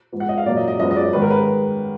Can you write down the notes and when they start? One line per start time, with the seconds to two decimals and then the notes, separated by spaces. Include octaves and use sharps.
0.12 G#2 F3 B3
0.20 F#5
0.29 D#5
0.38 F5
0.46 A#2 F#3 A#3 D5
0.57 D#5
0.68 D#5
0.79 F#2 F3 G#3 B3 D#5
0.91 D#5
0.96 D5
1.13 G#2 D#3 G#3 B3 B4
1.22 A#4
1.30 B4